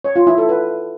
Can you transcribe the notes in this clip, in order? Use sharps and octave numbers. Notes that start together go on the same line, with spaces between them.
C#5
F4
E4
A4
B4